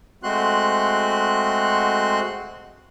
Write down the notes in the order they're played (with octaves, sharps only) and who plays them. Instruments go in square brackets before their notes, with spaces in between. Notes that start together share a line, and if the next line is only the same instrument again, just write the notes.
[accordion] G#3 A3 C4 F#4 C6 F#6